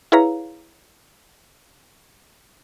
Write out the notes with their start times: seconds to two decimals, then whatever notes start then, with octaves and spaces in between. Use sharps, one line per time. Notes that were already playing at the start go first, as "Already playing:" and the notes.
0.12 E4 G#4 B4 C#5 F5 A#5